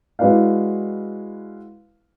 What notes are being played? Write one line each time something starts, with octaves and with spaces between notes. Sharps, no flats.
G#3 E4 F#4 B4 D5 F5